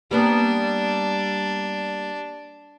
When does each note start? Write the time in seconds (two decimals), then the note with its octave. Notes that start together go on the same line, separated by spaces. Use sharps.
0.11 G3 A#3 B3 D4